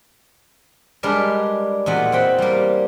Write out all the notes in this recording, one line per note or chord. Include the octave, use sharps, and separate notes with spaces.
G3 G#3 D4 A#4 B4
E2 A#2 F#4 D#5 F#5 B5
C4 F#5 G5 B5
G3 A#3